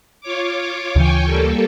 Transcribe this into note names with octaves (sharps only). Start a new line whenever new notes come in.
F4 C#5 D6
D2 C#3 E3 G5 G#5 C#6
G3 A#3 A4